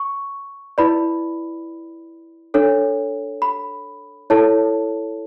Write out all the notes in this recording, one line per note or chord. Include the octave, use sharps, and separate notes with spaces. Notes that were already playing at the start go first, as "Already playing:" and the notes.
Already playing: C#6
E4 B4 D5 B5
D4 A4 C#5
B5
E4 A4 C#5 A5